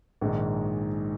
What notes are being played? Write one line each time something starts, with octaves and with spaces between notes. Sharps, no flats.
A#1 G#2 D#3 G#3 D#4